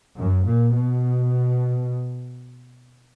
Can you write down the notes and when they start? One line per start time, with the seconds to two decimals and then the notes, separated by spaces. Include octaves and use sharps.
0.16 F#2
0.45 A#2
0.73 B2